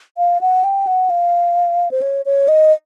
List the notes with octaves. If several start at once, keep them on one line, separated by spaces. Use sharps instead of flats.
F5
F#5
G5
F#5
F5
C5
C#5
C#5
D#5